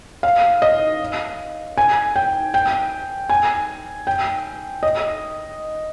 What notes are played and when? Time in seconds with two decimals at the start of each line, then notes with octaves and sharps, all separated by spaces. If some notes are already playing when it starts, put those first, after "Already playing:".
0.23 F5
0.62 D#5
1.77 G#5
2.16 G5
2.54 G5
3.30 G#5
4.07 G5
4.83 D#5